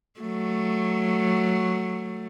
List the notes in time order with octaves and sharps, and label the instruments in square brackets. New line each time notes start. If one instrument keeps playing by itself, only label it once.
[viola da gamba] F#3 A3